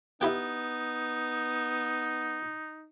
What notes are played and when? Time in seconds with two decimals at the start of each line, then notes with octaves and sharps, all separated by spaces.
0.21 B3 D#4 E4 G4 G5